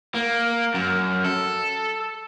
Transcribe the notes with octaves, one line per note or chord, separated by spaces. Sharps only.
A#3
F#2
A4